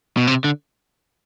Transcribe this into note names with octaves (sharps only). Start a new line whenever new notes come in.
B2
C3
D3